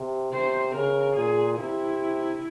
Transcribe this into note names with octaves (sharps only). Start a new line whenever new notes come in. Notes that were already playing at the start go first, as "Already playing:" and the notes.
Already playing: C3
C3 C5
C#3 A#4
A#2 G#4
C3 E4